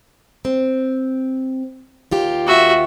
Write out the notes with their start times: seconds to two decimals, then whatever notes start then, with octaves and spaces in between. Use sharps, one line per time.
0.45 C4
2.11 D#2 F4 G4
2.47 F#4 E5